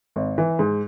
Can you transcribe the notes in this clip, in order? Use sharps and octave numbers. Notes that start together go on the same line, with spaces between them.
G#1
E3
G#2